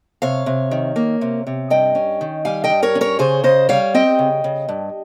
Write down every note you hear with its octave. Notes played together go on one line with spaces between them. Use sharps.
C3 C#5 F5
C3
D#3
A#3
C3
C3
G2 D#5 G5
C#4
D#3
G3 F5 G#5
D#5 G5
G2
A#4 C#5
C#4
A#4 C#5
C#3 G#4 C5
C#3 C5 D#5
G3 C#5 F5
C4 D#5 G5
C#3
C#3
G2